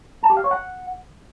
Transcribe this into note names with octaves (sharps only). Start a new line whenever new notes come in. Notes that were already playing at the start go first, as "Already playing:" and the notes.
A5
G4
F5
C#5
F#5